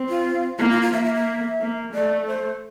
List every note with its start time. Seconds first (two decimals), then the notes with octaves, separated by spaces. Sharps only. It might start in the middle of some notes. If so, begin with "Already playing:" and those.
Already playing: C4
0.09 F4
0.59 A#3 E4
0.70 F4
0.82 F4
0.93 A#3 E5
1.04 E5
1.15 E5
1.61 A#3
1.93 A3 D5
2.27 C5